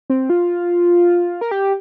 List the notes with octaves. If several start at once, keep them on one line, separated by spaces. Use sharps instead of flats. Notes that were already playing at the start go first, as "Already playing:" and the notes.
C4
F4
A#4
G4